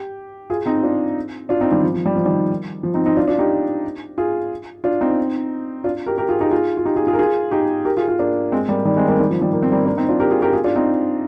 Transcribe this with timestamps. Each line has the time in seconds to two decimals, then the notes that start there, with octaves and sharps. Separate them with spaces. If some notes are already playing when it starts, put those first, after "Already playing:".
Already playing: G4
0.50 F4 G#4
0.66 C4 D#4
0.83 D4 F4
1.49 D4 F4
1.61 C4 D#4
1.72 D#3 G3
1.83 F3
1.94 F3
2.06 G3
2.16 F3
2.25 D#3 G3
2.83 F3
2.94 C4 D#4
3.06 C4 D#4
3.17 D4 F4
3.28 D4 F4
3.39 D#4 G4
4.18 F4 G#4
4.84 D4 F4
5.01 C4 D#4
5.84 D4 F4
6.06 G4 A#4
6.18 G4 A#4
6.29 F4 G#4
6.41 D#4 G4
6.51 F4 G#4
6.77 F4
6.86 D#4 G4
6.96 F4 G#4
7.07 F4 G#4
7.13 A#4
7.19 F4 G#4
7.51 D#4 G4
7.85 G4 A#4
7.97 F4 G#4
8.08 F4 G#4
8.19 A#3 D4
8.52 G#3 C4
8.69 G3 A#3
8.85 D#3 G3
8.96 G#3 C4
9.08 G3 A#3
9.19 D#3 G3
9.30 F3
9.41 D#3 G3
9.53 A#3
9.62 C4
9.72 G3 A#3
9.86 A#3 D4
9.97 C4 D#4
10.09 D4 F4
10.20 G4 A#4
10.31 F4 G#4
10.42 G4 A#4
10.53 F4 G#4
10.64 D4 F4
10.76 C4 D#4